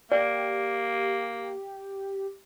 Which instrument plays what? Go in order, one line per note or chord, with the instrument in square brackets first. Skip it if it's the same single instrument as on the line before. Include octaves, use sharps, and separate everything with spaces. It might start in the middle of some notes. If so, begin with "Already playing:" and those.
[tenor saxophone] A#3 [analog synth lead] G4 [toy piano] D5